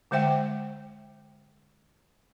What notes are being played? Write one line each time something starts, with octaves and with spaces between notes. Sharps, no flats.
D3 G#3 C5 E5 G5